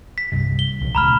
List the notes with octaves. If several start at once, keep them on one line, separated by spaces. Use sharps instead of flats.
B6
C2 G2 C3
G7
C2 B2 F3
D#1 C#2 A#5 B5 F6